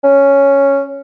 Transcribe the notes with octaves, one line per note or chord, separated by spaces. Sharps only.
C#4